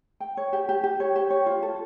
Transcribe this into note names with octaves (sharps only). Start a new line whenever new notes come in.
G5
C#5
G4
G4
G4
C#5
G4
C#5
F4
A4